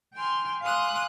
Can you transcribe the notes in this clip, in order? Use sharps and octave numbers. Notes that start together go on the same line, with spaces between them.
G5 G#5 C6 F6
F5 G#5 C6 D6 D#6 F#6